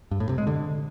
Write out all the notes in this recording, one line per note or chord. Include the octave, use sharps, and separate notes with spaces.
G2
A2
C3
G#3
D3